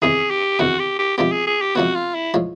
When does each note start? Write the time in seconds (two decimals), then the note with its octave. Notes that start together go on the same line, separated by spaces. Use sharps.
0.02 E2 C3 D#3 G#4
0.30 G4
0.59 E2 C3 D#3 F#4
0.79 G4
0.99 G4
1.18 C3 F3 G#3 B3 G4
1.32 G#4
1.47 G#4
1.61 G4
1.75 C3 F3 G#3 B3 F#4
1.95 F4
2.15 E4
2.34 A2 F3 G#3